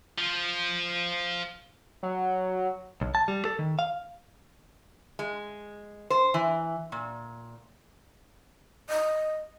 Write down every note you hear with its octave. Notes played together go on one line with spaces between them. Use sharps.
F3
F#3
B1
A5
G3
A4
D#3
F5
G#3
C5
E3
A#2
D#5